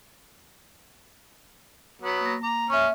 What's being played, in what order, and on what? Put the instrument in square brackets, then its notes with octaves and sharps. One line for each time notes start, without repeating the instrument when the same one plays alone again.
[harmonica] F#3 B3
[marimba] A#3 A#6
[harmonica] A#5 [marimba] D6
[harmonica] C#4 [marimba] E5 C#6